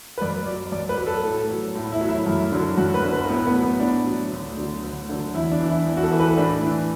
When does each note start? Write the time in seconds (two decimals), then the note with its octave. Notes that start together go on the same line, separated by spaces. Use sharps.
0.18 B4
0.21 F#2 D5
0.46 F#3 D5
0.72 F#2 D5
0.89 B4
0.98 F#3
1.07 A4
1.24 A2
1.49 F#3
1.75 A2
1.92 E4
2.01 F#3
2.09 E4
2.27 F#2
2.52 D3 F#3
2.77 F#2 F#4
2.94 B4
3.04 D3 F#3
3.13 B4
3.29 A2 B3
3.47 B3
3.54 F#3
3.63 B3
3.80 A2 D4
4.06 F#3
4.31 D2
4.57 D3 F#3
4.84 D2
5.09 D3 F#3
5.34 E2 E4
5.52 D4
5.60 E3
5.68 E4
5.86 E2
5.97 F#4
6.03 A4
6.11 E3
6.20 B4
6.37 A2 D4
6.63 E3